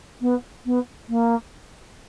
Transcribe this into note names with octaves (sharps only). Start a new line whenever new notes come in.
B3
B3
A#3